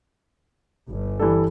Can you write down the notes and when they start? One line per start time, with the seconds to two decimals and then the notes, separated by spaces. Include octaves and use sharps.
0.88 G1
1.19 E3 G3 A4